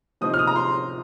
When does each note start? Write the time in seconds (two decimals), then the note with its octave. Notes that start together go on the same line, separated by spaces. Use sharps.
0.21 C3 F3 C4 D#4 D#6
0.34 F6
0.39 D#6
0.47 A#5
0.56 C6